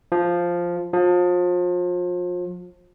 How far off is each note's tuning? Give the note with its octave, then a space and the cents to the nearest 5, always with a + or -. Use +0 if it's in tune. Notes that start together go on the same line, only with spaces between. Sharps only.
F3 +0
F3 +35